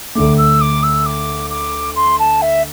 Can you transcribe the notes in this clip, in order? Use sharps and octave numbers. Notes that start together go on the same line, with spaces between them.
D2 D3 A3 D6
E6
D6
E6
D6
D6
C6
A5
E5